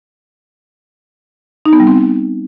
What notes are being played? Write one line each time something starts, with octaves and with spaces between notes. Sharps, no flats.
D#4
B3
G3
C4